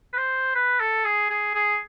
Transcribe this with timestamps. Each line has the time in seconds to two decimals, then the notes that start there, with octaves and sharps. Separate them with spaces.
0.13 B4
0.17 C5
0.55 B4
0.80 A4
1.05 G#4
1.30 G#4
1.55 G#4